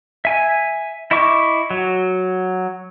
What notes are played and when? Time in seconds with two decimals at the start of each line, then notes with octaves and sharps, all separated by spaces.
0.25 E5 G#5
1.11 E4 D#5 E5 C#6 D6
1.71 F#3